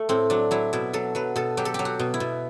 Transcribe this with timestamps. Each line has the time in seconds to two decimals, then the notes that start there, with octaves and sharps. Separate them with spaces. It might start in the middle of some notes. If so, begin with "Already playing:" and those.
Already playing: A3
0.09 A2 C4
0.30 F#3 D4
0.51 F#3 E4
0.73 B2 E4
0.93 F#3 A4
1.15 F#3 B4
1.36 B2 A4
1.57 F#3 G4
1.65 A4
1.74 F#3 G4
1.85 F#4
1.99 B2
2.14 E4
2.20 B2